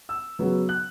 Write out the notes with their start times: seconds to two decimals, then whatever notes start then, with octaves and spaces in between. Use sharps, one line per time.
0.09 E6
0.39 C#3 F#3 B3
0.69 F#6